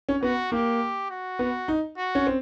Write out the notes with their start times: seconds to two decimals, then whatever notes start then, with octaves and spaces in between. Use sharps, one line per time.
0.09 C#4
0.22 B3 F#4
0.52 A#3 G4
1.10 F#4
1.39 B3
1.68 D#4
1.97 F#4
2.15 C#4
2.27 C4